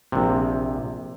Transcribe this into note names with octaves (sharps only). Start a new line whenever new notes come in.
A#1 C3